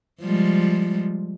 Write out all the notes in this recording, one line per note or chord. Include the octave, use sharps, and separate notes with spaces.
F3 G3 G#3